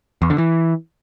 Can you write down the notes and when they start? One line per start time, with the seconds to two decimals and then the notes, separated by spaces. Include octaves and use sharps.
0.22 E2
0.30 D3
0.38 E3